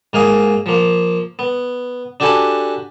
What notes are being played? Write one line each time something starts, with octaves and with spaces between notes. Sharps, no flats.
G#2 A#3 F5 G#5 D#6
F3 A#3
B3
D4 F#4 G4 A4 G#5 B5